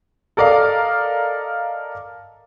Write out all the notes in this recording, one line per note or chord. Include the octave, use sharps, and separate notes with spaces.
A4 A#4 D5 D#5 F5